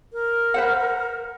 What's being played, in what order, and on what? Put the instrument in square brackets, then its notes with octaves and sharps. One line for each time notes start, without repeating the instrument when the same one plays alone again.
[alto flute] A#4
[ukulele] B4 C5 F#5